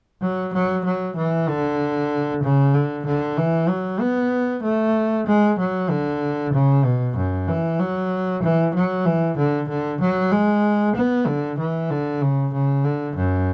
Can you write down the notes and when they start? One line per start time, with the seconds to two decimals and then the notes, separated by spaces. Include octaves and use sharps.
0.22 F#3
0.53 F#3
0.85 F#3
1.16 E3
1.48 D3
2.43 C#3
2.74 D3
3.06 D3
3.38 E3
3.69 F#3
4.01 B3
4.64 A3
5.27 G#3
5.59 F#3
5.90 D3
6.53 C#3
6.85 B2
7.16 F#2
7.48 E3
7.80 F#3
8.43 E3
8.74 F#3
9.05 E3
9.37 D3
9.69 D3
10.01 F#3
10.32 G#3
10.96 B3
11.27 D3
11.59 E3
11.90 D3
12.21 C#3
12.53 C#3
12.84 D3
13.16 F#2